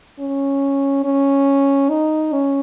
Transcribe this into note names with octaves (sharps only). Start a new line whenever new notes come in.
C#4
C#4
D#4
C#4